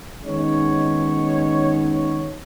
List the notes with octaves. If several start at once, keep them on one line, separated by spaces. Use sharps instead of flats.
D#3 G#3 B3 C#4 D#4 C#5